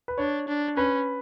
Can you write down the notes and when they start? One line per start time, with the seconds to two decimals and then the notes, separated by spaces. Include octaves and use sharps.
0.08 B4
0.18 D4 C#5
0.48 D4
0.76 C#4 B4